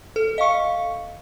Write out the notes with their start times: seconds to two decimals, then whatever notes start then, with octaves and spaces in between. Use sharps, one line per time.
0.16 A4
0.38 D#5 F5 C#6 C#7